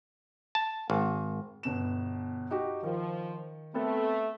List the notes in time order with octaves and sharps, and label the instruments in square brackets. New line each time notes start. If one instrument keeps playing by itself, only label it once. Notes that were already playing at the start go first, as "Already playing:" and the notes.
[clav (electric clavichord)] A5
G#1
[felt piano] G1 B2 E7
D#4 F#4 G4
[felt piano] D#3 [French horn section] F3
[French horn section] A3 [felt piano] B3 C4 A4